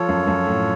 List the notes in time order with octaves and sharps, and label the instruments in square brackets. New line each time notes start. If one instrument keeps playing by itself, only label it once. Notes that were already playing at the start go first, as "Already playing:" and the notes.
Already playing: [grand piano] F3 [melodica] F4 A4 C#5
[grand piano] F#2
F#2
A2